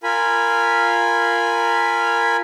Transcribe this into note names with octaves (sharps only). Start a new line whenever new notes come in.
F4 A#4 G#5 B5